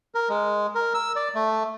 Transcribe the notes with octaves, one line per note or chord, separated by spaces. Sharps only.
A#4
G#3
A#4
E6
D5
A3